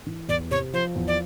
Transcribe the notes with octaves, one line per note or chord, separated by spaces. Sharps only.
E3
E2 D5
C3 C#5
F3 C5
E2
D5